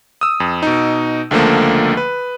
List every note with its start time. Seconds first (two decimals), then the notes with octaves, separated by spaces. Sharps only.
0.21 D#6 E6
0.40 F2
0.63 B2 D#4
1.31 C#2 D3 F3 A3 A#3
1.97 B4